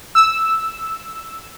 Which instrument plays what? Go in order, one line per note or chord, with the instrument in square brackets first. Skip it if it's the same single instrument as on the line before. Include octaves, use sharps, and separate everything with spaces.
[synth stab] E6